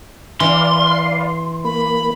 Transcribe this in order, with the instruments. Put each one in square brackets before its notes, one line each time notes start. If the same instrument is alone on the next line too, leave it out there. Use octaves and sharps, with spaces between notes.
[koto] E3 [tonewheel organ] B4 D5 F5 [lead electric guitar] C6
[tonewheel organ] A#3 [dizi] B5